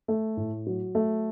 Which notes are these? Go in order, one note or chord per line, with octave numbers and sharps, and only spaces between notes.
A3
A2
F#3
A3